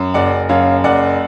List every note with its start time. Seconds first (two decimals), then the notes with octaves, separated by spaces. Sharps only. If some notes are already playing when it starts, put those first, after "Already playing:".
Already playing: F#2
0.14 F#1 D5 F#5
0.49 F#2 C#5 F5
0.84 F#1 D5 F#5